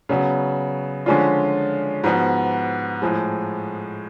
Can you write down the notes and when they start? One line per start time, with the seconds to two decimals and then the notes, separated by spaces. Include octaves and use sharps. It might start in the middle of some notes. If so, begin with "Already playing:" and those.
0.09 C#3 F#3 B3
1.06 D3 F3 G#3 C#4 F4
2.04 G#2 F3 B3 F#4
3.02 A2 F3 G#3